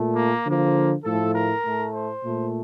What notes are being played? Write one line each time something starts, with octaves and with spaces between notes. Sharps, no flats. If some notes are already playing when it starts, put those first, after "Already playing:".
Already playing: A#2 A3
A#3
D3 F3 A#3
A2 F3 A3 A4
A#4
A2 A3
C5
A#2 A3